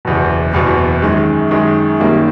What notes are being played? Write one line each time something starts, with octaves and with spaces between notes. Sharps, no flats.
F#1 E2 B2
F#1 E2 B2
F#2 D#3 G#3
F#2 D#3 G#3
F#2 D#3 G3 A#3